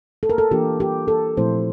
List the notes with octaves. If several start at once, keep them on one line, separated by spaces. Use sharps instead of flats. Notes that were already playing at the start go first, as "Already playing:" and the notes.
A4
A#4
A4
E3 A#3 D4 F4 G4
G4
A4
A#2 F3 A3 C4 E4 C5